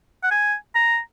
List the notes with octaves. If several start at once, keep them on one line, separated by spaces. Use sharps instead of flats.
F#5
G#5
A#5